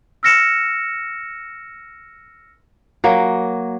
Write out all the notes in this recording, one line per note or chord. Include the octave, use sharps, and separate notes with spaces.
E6 F6 A#6 C#7 E7
F#3 A#3